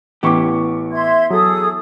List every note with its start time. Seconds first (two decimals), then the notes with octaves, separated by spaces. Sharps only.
0.23 A1 E3 B3 G4 C#6 D6
0.92 E5 C6 G#6
1.30 F#3 G#4 A4 D#6